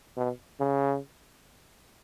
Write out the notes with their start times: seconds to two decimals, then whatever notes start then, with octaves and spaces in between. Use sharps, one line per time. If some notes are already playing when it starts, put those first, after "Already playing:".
0.17 B2
0.60 C#3